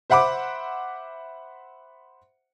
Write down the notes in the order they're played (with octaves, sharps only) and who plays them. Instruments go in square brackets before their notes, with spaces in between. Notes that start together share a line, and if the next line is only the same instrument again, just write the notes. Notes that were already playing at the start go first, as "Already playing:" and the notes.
[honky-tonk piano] C5 E5 F#5 B5 D6